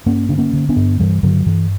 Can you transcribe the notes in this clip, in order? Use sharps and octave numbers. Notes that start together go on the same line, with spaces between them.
G2 A#3 C#4
D3 D4
A#3 C#4
D3
B3 D4
G2
G2 E3 G3
G2 D3 F#3
G2 E3